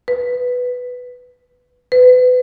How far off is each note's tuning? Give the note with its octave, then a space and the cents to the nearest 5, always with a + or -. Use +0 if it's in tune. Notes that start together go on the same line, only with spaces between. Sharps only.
B4 +5
B4 +30